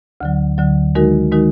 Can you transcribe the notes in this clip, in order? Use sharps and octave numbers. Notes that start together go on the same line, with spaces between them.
D2 D3 F#3
D2 D3 F#3
D#3 G#3 D#4 F#4 A#4
D#3 G#3 D#4 F#4 A#4